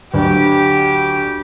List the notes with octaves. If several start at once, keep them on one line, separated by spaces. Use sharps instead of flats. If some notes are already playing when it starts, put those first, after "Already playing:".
D2 F#3 D4 G4